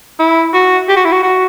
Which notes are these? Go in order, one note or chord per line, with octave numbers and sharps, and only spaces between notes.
E4
F#4
G4
F#4
E4
F#4
F#4